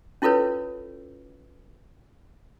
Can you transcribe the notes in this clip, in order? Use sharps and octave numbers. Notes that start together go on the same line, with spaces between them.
C#4 E4 F4 A4 B4 C#5